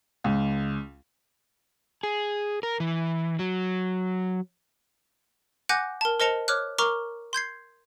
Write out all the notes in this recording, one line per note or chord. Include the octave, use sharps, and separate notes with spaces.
C#2
G#4
A#4
E3
F#3
F#5 G#5 D6 F#6 G6 A#6
A#4 A5
A#4 C5 D#5 A5 C#7 F7
C#5 D6 F6 F#6
A#4 A#5 C#6 D6 F6
C6 G6 G#6 C7